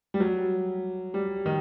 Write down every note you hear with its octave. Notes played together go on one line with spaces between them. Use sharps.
G3
F#3
G3
D#3